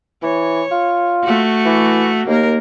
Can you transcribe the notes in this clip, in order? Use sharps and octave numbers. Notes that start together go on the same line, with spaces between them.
E3 C#5
F4
A3 F#4
E3
D#2 A#3 A#4